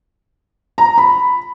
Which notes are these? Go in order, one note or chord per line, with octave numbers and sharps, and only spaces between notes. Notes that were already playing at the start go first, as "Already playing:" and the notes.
A#5
B5